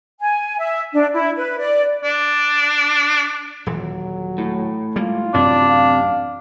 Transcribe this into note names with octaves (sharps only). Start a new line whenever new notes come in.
G#5
E5
D4
E4
B4
D5
D4
D#1 E3 F#3
A2
G3 G#3 A#3 F4
A1 F#2 C3 D4
F5